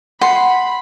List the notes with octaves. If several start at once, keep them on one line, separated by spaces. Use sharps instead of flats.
F#5 B5 C6